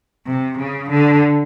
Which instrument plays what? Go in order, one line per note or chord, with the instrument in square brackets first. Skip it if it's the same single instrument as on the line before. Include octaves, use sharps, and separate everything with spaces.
[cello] C3
C#3
D3